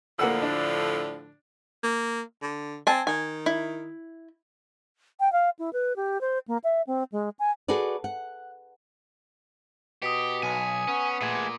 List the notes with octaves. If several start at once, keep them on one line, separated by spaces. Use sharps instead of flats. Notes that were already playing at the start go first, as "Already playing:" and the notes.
A2 D3 F3 A#3 F#5 E6
D4
A#3
D3
C4 G#5 A5
D#3 G#5
E4
G5
F5
E4
B4
G4
C5
A#3
E5
C4
G#3
G#5
F#4 G#4 A4 B4 D5
F#5
B2 G4 D#6 B6 C#7
B1 G#5
B3 C#4
A#2 A3 G#4